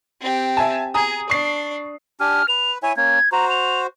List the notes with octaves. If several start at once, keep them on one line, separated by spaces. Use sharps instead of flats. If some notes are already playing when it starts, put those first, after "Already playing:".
C4 G4
E5 G#5 A5
G#4 G#5 A#5 D#6
D4 D5 C#6 C7
D4 G4 G#5 F6
B4 F7
E4 C#5 E5 G#5
A#3 C#4 G#6
F#4 C5 A#5
F7